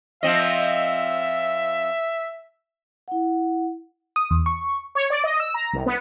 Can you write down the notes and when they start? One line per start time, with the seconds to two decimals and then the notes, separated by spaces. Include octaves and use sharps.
0.23 F3 C4 D#5 E5
3.08 E4 F#5
4.16 D#6
4.31 E2
4.46 C#6
4.95 C#5
5.10 D5
5.24 D#5
5.40 E6
5.54 A#5
5.73 C2
5.86 B3